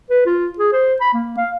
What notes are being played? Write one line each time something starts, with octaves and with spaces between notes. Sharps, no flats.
B4
F4
G#4
C5
B5
A#3
F5